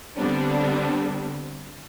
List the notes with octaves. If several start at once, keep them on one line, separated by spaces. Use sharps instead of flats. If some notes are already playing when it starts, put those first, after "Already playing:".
D3 G3 B3 C4 D4